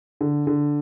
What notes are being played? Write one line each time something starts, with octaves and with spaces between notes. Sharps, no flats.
D3
D3